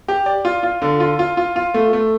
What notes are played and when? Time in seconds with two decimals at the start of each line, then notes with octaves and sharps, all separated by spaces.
0.08 G4
0.26 D5
0.45 F4
0.63 F4
0.82 D3
1.00 F4
1.19 F4
1.37 F4
1.56 F4
1.74 A3
1.93 A3